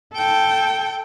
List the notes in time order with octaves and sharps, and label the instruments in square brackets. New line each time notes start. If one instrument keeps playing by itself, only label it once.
[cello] A4 G5